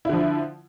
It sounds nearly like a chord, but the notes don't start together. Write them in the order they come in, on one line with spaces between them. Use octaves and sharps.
E4 D3 F3